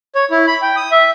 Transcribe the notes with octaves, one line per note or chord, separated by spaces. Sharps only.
C#5
E4
B5
G5
D#6
E5